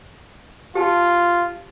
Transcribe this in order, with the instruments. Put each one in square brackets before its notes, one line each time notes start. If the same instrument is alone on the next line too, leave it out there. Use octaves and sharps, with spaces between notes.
[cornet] F4 [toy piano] G4 A5